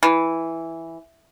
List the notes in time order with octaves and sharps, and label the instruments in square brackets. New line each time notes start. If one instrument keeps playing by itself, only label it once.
[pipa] E3